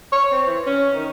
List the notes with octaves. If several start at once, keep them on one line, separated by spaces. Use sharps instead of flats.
C#5
C4
E3
C#4
D#3